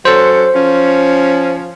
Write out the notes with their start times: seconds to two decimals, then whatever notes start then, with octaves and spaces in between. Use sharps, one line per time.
0.05 F#3 C#4 A4 C5
0.54 F3 C#4